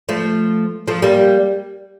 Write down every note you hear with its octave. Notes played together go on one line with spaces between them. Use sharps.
F3 A3
F3 A3
G3 A#3